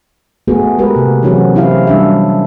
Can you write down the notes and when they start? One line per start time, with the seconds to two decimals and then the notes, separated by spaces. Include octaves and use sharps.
0.48 A3 B3 F#4 G#4
0.78 G#3 G4 A#4 B4
0.96 C3
1.23 E3 F#3 C4 C#4 F#4 G#4
1.55 C4 E4 G4 F5
1.87 G3 D4 E5